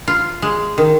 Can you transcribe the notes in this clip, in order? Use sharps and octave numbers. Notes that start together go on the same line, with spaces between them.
F4
G#3
D#3